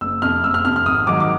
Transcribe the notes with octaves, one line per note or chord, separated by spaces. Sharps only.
F#1 E6
F2 C3 F6
F#1 E6
F6
F2 C3 F6
F6
G#1 D#6
G#2 D#3 F#3 D6
D6